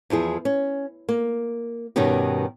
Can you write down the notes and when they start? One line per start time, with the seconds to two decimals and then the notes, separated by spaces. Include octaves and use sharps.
0.10 E2 F3 E4 G#4
0.45 C#4
1.09 A#3
1.96 G2 B2 D#3 C#4 D#4 G4